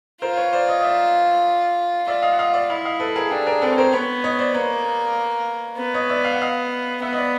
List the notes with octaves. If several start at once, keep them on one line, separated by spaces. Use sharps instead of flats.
F4 A#4 C5
C5
B4 C#5
C5 D5
C#5 D#5
D#5
D5 E5
F4 D5 E5
D#5 F5
F#5
D#5 F5
D#5
D5 E5
E4 D#5 F5
D#5 F5
A4 B4
G#4 A#4
D4 G4 A4
G#4 A#4
C4 A4 B4
C#5
A#4 C5
B3 B4 C#5
C#5 D#5
C5 D5
A#3 B4 C#5
B3
C#5 D#5
D5 E5
F5
F#5
D#5 F5
B3 E5 F#5
D#5
D5 E5